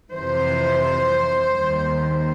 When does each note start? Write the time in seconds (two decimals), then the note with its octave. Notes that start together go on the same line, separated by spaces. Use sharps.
0.13 F2 C3 E3 C5
1.52 D#2 D#3 G3